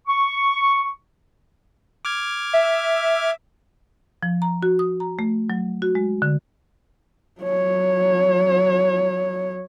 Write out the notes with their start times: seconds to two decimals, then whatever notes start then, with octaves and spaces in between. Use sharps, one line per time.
0.07 C#6
2.05 D6 F6 G#6
2.53 E5
4.23 F3
4.42 A#5
4.63 F#4
4.79 D#6
5.00 A#5
5.19 A3
5.50 F#3
5.82 F#4
5.95 G#3
6.22 D3
7.41 F#3 C#5